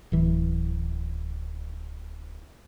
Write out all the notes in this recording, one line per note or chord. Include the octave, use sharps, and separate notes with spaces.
D1 E3